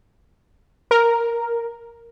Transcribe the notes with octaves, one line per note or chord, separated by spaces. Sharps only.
A#4